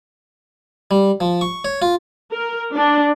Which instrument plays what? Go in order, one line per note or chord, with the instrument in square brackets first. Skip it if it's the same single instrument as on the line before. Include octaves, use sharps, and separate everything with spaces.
[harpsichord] G3
F3
C#6
C#5
F4
[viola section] A#4
D4